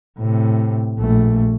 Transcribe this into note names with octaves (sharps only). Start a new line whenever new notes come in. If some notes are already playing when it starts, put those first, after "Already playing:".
A2 C3
A#1 A3